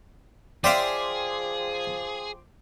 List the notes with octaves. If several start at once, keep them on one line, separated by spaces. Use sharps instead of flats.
F3 G#4 D5 E5 F5 G5 C6 D6